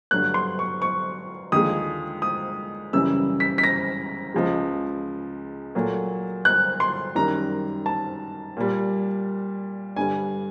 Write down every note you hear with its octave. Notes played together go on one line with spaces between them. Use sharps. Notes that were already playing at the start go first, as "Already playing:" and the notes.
G2 D3 F#3 A3 F#6
C6
C#6
C#6
D#2 D3 F3 G#3 D#6
D#6
F#2 C#3 E3 G3 E6
B6
B6
A#6
C#2 C#3 F3 G#3
A#2 F#3 A3
F#6
C6
F#2 D#3 G3 A#5
A5
A#2 G3
G2 D3 G3 G#5